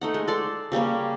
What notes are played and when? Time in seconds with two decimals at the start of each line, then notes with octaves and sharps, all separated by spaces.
0.01 A3 D#4 F#5
0.14 G#3
0.28 A4 D5 C6
0.72 C#3 G3 A#3 C#4